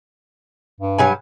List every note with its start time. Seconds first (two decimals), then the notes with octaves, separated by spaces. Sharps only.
0.80 G2
0.98 F#3 G3 G#5